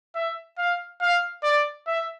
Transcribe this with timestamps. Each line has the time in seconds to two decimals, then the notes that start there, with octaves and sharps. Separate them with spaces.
0.15 E5
0.58 F5
1.01 F5
1.43 D5
1.87 E5